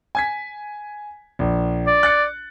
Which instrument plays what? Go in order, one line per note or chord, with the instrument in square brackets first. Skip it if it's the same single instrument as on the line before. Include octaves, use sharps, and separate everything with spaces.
[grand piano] G#5 G#6 B6
A#1
[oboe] D5
[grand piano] F#6 A6 C#7